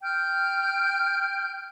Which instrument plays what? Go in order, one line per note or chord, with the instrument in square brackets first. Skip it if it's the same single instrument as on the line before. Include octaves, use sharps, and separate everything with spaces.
[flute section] G5 F6 G6